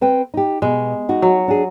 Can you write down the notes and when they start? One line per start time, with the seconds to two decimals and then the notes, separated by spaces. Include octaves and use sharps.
0.01 C4 B4 G5
0.34 D#4 G4
0.62 B2 G#3
1.09 D#4 F#4
1.22 F#3
1.48 D4 G#4